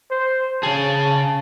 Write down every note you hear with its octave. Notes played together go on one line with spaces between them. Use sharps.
C5
C#3 G#4 A5